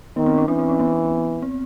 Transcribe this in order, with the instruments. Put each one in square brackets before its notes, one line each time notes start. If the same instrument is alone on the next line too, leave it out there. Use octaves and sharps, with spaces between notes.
[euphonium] D#3 [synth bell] B3
[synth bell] C4
C#4
[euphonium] E3 [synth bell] C4 D4
[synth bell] C4
C#4
B3
C4